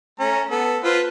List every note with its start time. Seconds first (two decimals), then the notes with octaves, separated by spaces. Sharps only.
0.20 A3 C#4 A#5
0.50 B3 A4
0.83 F4 B4 C5